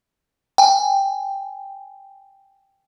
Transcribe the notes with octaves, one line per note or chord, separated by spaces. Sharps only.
G5 G#5